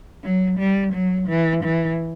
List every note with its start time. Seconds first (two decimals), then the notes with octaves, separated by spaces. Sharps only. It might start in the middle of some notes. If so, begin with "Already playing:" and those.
0.24 F#3
0.59 G3
0.94 F#3
1.28 E3
1.64 E3